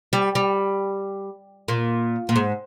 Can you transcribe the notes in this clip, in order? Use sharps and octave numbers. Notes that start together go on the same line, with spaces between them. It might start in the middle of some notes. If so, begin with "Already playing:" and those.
G3
G3
A#2
A#2
G#2